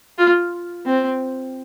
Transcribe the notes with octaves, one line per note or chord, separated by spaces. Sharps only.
F4
C4